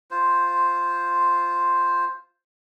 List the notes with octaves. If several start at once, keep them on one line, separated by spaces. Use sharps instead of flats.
F4 C5